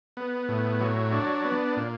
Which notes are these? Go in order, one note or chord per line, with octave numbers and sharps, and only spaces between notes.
B3
A2
F#3
D4
B3
A#2